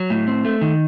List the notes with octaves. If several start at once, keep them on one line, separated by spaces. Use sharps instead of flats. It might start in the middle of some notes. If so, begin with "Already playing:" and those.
Already playing: F#3
A2
C4
A3
D#3